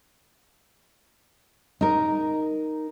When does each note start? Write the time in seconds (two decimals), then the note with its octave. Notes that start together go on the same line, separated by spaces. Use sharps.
1.81 D#4 A#4